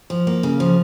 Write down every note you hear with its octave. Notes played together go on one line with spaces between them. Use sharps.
F3
A#3
C#3
F3